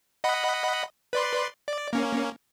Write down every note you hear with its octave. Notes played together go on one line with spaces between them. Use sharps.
D#5 F#5 B5
B4 D5 C6
D5
A#3 C#4